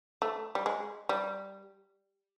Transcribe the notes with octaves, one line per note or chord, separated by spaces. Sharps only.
A3
G3
G#3
G3